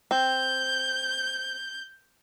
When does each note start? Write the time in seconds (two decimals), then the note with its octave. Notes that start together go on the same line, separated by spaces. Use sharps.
0.11 C4 G6